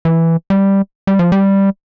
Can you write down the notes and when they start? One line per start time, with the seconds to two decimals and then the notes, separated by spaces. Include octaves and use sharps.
0.05 E3
0.50 G3
1.07 G3
1.19 F3
1.32 G3